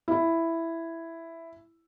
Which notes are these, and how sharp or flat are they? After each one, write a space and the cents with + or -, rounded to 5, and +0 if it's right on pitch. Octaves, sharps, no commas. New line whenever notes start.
E4 +5